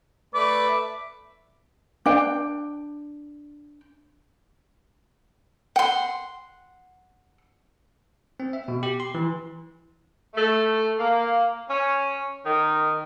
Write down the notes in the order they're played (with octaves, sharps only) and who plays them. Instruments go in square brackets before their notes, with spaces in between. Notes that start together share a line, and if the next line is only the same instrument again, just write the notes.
[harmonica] A3 B4 D5 [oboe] D6
[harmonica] E5
[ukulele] D4 G5
[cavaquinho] F#5 C6 [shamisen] G5
[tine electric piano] C4
E5
B2
G4
C6
E3
[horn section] A3
A#3
C#4
D#3